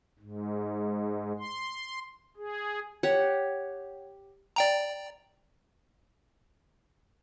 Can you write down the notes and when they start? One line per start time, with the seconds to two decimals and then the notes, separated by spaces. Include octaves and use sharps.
0.19 G#2
1.40 C6
2.37 G#4
3.03 G4 C#5 F#5
4.56 D5 G5 A#5